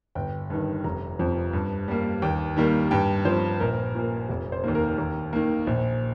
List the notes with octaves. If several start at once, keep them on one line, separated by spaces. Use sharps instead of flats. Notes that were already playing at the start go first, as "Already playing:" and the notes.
G1 G5
G2 D#3
F1 A#5
F2 F3
G2
G3 A#3
D#2 G5
D#3 G3 A#3
G2 G5
F3 C4 C5
A#1 A#4
A#2 A#3
F1
C5
D#2 D#3 A#3
A#4
D#2 A#4
D#3 A#3
A#1